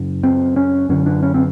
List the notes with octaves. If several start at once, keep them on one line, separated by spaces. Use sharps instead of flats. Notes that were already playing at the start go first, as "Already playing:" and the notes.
Already playing: F#2 C#3
C4
C#4
F#2 D3 C#4
D4
C#4
C4